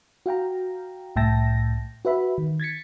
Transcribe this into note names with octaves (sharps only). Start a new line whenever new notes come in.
F#4 F5 G5 A#5
C2 A2 E5 G5 A5 A#6
F#4 B4 E5 B5
D#3
G#6 A6 B6 C#7